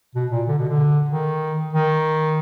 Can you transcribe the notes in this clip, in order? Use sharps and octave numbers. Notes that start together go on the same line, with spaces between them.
B2
A#2
D3
B2
D3
D#3
D#3